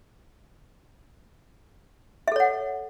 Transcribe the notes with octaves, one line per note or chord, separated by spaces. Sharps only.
A4 C#5 E5 F#5